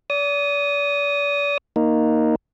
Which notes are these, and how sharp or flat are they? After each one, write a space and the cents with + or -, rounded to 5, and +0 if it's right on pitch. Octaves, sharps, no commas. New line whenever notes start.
D5 -40 D#6 +0
A#3 +0 D#4 +0